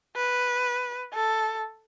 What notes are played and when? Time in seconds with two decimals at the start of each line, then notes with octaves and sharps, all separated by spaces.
0.16 B4
1.14 A4